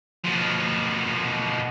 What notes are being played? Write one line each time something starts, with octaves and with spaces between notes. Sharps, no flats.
B2 F3